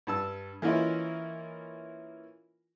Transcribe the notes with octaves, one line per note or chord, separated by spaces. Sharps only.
G2 A5 E6
E3 A#3 C#4 E4 F4 D#5